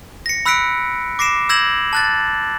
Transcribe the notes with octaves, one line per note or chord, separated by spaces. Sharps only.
A#6 C#7
B5 E6 F#6 B6 C#7 D7
D6 A#6 C7 D7 E7
E6 G6 G#6 A#6 E7 F#7
A5 F#6 A6